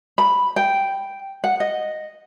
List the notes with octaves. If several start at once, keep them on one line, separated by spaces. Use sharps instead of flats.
B5
G5
F#5
D#5